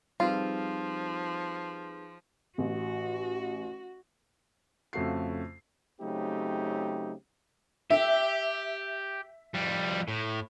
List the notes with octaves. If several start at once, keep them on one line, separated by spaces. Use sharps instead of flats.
F3 G3 C4 D#4 F4 G#4 B4
A1 F#4
F2 C#3 A3 F#4 C7
C#3 F#3 A3 C4 D#4 G4
G4 E5
F2 G3
A2